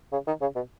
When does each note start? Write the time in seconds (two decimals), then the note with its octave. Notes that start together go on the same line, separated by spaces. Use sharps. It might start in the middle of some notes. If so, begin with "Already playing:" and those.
0.12 C#3
0.27 D#3
0.41 C#3
0.55 B2